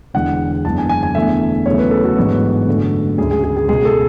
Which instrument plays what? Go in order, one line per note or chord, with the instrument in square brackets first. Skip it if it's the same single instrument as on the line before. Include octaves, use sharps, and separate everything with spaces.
[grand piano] E1 E2 D3 G#3 F#5
F#1 E2 D3 G#3 A5
G#5
G#5
G#5
E1 E2 D3 A3 E5
E2 C#3 F#3 A3 C#5
B4
A4
F#4
A1 G#2 F#3 B3 D4
F#2 D3 A3
D2 C#3 G#3 D4 G#4
G#4
G#4
G#4
C#2 B2 G#3 G#4
A4